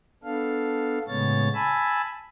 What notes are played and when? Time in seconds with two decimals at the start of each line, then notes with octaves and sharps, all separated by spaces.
0.24 B3 D4 A4 F5
1.08 A2 C#3 G#3 B3 C#5 A6
1.54 G#5 A5 B5 E6